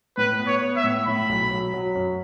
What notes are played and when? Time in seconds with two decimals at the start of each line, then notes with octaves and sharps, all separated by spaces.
0.18 A2 B4
0.39 B3
0.47 C#5
0.62 B3
0.76 E5
0.84 A2
1.06 A2 B5
1.29 B1
1.51 F#3
1.74 F#3
1.95 F#2